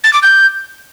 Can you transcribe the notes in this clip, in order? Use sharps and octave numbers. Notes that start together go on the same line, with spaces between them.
A6
D6
G6